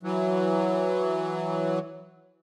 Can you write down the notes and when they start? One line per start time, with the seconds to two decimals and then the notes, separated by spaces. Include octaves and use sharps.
0.03 E3 F#3